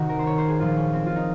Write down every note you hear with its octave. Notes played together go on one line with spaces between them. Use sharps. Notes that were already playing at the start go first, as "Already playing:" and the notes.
Already playing: C3 D#3 D#4 F#4
A#4
C5
C#5
C5
G#4
A#2 F3 F4
C#4
C4
F4
D#4